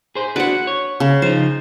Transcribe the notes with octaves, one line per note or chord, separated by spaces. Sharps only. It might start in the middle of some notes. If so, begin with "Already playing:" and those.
G#4 C5
D4 F#4 B4 F#5
C#5
C#3
F3 D#4 C5